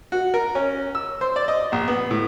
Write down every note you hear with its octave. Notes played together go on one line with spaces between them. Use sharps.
F#4
A#4
C#4
E6
C5
D5
D#5
A#1
B3
A2